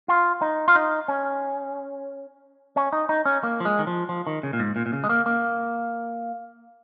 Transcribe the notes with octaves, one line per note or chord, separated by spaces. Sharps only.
F4
D#4
F4
D#4
C#4
C#4
D#4
D#4
C#4
A#3
F3
G#3
D#3
F3
F3
D#3
C#3
A#2
G#2
A#2
A#2
C#3
G#3
A#3
A#3